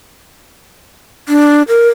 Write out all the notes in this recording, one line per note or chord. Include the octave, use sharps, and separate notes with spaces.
D4
A#4